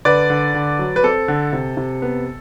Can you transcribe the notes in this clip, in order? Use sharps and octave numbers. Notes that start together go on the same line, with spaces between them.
D3 B4 D5
D3
D3
F#3
B4
C4 A4
D3
C3
C3
B3